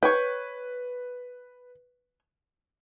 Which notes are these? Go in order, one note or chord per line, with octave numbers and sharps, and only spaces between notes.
B4 C#5 G5